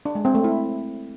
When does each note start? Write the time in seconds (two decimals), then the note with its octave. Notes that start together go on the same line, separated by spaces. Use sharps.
0.05 D4
0.15 G#3
0.25 C4
0.35 A3
0.44 E4